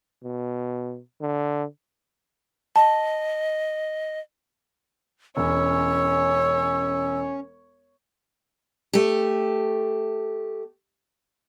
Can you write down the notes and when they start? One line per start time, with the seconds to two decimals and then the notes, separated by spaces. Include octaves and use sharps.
0.23 B2
1.21 D3
2.76 D#5 A5
5.37 E1 C#4 C#5 E6
8.93 A3 G4